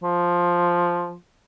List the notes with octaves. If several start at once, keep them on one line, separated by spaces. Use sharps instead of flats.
F3